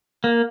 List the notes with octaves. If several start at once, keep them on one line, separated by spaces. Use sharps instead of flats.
A#3